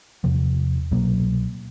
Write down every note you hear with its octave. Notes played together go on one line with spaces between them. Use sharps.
E2 C3 F3
C2 B2 F#3 A#3